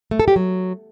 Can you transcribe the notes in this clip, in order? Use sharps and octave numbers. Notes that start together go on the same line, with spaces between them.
A3
A4
G4
F#3